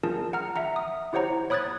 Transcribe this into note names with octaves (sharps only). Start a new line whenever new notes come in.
D4 F4 G#4 A#4 A5
F#5 A#5 F6
E5 F#5 A#5
D#6
E4 G4 C5 C#5 F#5 A#5
C#5 B5 D#6 F#6 G#6 A6